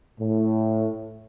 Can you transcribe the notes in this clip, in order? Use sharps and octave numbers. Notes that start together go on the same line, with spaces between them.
A2